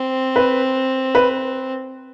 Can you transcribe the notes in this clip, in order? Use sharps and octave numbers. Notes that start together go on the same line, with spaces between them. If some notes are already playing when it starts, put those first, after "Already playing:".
Already playing: C4
B4
B4